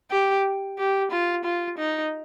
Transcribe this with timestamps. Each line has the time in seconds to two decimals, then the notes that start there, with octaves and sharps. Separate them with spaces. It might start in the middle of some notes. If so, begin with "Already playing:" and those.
0.11 G4
0.79 G4
1.11 F4
1.45 F4
1.78 D#4